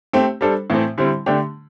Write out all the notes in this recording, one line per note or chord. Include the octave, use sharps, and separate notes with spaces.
A3 C4 G4
G3 D4 A4 C5
A2 E3 A3 C4
D3 G3 C4 E4
D3 A3 D4 G4